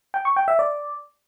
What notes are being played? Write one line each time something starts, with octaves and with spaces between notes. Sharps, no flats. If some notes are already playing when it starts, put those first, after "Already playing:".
G5
C#6
G5
E5
D5